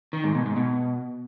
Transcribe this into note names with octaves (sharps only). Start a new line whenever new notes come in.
D#3
G#2
B2
G#2
B2